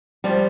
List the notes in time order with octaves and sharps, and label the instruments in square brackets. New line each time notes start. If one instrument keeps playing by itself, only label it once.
[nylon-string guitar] F3 G3